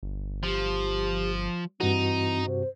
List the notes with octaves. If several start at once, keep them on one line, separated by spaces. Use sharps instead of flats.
G1
F3 G4
G2 E3 C4 D#4 F#4
C3 C5